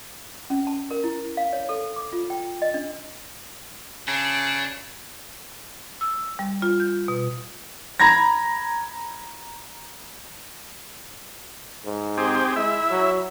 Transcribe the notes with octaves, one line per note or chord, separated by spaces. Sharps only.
C#4
A5
A#4
E4
F5
C#5
A4
D6
F4
G5
D#5
D4
C#3 D4
E6
G3
F4
G6
B2
A#5 B5 G#6 A#6
G#2
C4 G4 G#4
G#3 E4 E5
F#3